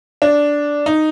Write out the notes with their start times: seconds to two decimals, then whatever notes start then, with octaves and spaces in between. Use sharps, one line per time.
0.22 D4
0.86 D#4